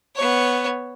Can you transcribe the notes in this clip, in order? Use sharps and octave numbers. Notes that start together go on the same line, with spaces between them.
B3 C#5